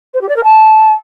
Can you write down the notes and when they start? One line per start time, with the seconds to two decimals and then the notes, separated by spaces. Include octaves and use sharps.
0.14 C5
0.21 G4
0.29 D5
0.36 A#4
0.44 A5